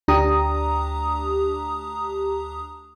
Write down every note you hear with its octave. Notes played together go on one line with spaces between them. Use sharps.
D2 D4 G4 A#5 D#6